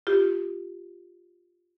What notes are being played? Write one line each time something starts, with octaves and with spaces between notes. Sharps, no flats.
F4 G4